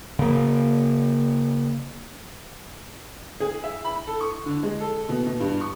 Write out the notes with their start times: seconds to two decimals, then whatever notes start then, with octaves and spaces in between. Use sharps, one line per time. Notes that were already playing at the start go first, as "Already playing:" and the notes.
0.19 C#3 A#3
3.40 G#4
3.64 E5
3.84 B5
4.07 A4
4.21 C#6
4.46 D3
4.63 G#3
4.80 A4
5.09 B2
5.27 B2
5.40 G2
5.61 C#6